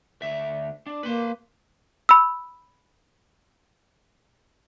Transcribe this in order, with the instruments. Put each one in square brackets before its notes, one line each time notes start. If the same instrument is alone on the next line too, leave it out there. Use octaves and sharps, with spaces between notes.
[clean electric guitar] D2 E5
D4
[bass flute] A#3 [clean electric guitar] B4 C6
[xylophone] B5 E6